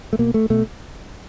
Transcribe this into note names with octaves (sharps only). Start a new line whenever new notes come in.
A3
B2 A#3
A3
B2 A3